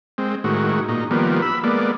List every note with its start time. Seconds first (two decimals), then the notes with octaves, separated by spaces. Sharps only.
0.18 G#3 C4
0.44 A2 D#3 G#3 F#4
0.89 A#2 D#4
1.11 D#3 F3 G3 A#3 B3
1.42 B5 E6
1.64 G#3 A#3 B3 D5